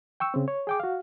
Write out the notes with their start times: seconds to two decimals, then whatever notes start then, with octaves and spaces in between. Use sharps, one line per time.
0.20 G5 C#6 E6
0.34 C#3 C4
0.48 C#5
0.67 G#4 G5 D6
0.80 F#4 F5